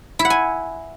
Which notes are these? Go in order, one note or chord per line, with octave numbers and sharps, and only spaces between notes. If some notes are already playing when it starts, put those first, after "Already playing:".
E4
F#5
G#5